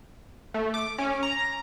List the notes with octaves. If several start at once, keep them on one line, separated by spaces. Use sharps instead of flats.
A3
D6
C#4
A#5